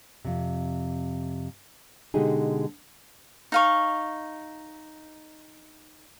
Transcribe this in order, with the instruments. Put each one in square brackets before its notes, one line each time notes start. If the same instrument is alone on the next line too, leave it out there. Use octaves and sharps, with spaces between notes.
[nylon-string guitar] F2 C3
B2 D3 G#3 D#4 G4 G#4
[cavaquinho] D#4 F5 C#6